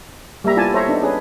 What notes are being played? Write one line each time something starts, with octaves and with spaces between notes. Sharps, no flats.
G3 A#3 E5 A#5
B3 E4 F4 D5 G#5 A5
A4 C5 C#5 E5 A#5
B3 D4 D#4 A4
C#4 G#4 B4